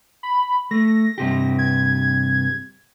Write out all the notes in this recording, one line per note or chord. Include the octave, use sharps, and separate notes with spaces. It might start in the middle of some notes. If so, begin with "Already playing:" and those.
B5
A3 A#6
G2 C3 G4
G#6